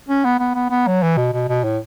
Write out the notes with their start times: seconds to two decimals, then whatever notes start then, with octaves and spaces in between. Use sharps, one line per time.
0.09 C#4
0.25 B3
0.39 B3
0.55 B3
0.70 B3
0.87 F#3
1.03 E3
1.17 B2
1.33 B2
1.48 B2
1.64 A2